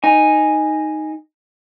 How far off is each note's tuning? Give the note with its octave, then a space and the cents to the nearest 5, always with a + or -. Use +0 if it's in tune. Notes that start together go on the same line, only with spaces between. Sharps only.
D#4 +0 G#5 -5